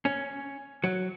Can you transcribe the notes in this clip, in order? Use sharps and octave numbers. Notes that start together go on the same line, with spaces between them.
C#4
F#3